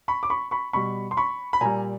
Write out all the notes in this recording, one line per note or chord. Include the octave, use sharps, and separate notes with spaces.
B5 C#6
D6
B5 C#6
B5 C#6
B2 G3 B5 C#6
C6
B5 C#6
B5
A#2 G3 G#5 A#5